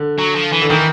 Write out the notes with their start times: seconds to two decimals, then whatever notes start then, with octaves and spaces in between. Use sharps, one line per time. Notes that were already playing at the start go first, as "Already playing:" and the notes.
Already playing: D3
0.18 F#3
0.35 F3
0.52 E3
0.62 D3
0.69 D#3 E3